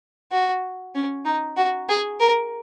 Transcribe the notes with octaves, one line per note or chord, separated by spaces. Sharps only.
F#4
C#4
D#4
F#4
G#4
A#4